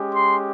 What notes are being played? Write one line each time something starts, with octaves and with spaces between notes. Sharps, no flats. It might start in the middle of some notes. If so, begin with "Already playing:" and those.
Already playing: G#3 C#4 G4
C6